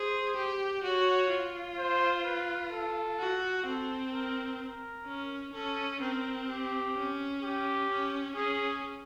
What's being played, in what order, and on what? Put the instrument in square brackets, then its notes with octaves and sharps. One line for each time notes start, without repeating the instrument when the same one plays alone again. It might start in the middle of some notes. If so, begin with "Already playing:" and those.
Already playing: [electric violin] G#4 [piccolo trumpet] C5
[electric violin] G4
[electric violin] F#4 [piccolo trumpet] C#5
[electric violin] F4
[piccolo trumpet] C5
B4
A4
[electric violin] F#4
[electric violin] C4 [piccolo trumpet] A4
[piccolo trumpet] A#4
A#4
[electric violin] C#4
[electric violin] C#4 [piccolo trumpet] A4
[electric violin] C4 [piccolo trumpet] A#4
[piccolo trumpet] G4
[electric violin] C#4
[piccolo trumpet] G4
[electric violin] C#4
[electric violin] C#4 [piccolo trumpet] G#4